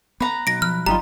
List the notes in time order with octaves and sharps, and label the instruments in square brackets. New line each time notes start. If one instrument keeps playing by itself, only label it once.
[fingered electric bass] B3 [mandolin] B4 A#5
[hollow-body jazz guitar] B1 [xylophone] A#6 D7
[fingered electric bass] F3 [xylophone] F6
[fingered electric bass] G1 F#3 [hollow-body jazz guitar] G3 D#4 F4 [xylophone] A#5